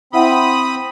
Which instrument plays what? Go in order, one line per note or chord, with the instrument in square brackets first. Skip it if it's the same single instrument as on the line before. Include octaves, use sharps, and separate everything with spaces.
[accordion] C4 B5 D#6 [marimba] E4 E5 F#5